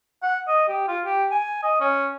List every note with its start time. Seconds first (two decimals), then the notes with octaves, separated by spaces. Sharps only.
0.23 F#5
0.48 D#5
0.68 G4
0.88 F4
1.05 G4
1.31 G#5
1.63 D#5
1.80 C#4